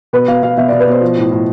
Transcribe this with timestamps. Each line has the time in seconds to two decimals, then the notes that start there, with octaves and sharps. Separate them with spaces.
0.13 B2 B4
0.28 B2 F5
0.42 B2 F5
0.57 B2 E5
0.68 D5
0.72 B2
0.80 B4
0.87 B2 C5
1.01 F3
1.17 A2
1.31 A2